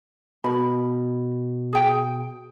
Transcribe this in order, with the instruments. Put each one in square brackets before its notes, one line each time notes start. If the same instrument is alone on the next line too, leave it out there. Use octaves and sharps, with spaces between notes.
[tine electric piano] B2 [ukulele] A#4 B5
[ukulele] G#4 G5